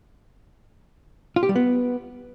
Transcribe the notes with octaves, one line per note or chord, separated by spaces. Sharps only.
F4
G4
G3
B3